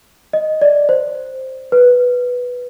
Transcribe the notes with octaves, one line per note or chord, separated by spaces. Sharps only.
D#5
D5
C5
B4